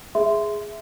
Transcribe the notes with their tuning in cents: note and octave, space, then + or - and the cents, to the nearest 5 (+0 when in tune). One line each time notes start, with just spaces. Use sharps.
G#4 +0 E5 +0 C6 -15